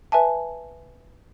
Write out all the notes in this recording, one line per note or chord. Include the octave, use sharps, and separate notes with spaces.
B4 E5 G#5 A5